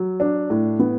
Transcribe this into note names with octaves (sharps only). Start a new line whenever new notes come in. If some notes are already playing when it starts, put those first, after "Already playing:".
Already playing: F#3
D4
A2
B3